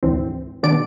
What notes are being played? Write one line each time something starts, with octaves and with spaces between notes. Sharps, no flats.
D2 G#2 E3 C4
B2 D#3 B3 D4 D5 D7